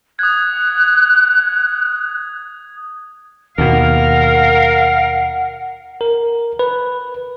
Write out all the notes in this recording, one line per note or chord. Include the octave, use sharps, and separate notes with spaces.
D#6 F#6 G#6
D#2 B2 A#4 F5 F#5
A#4
B4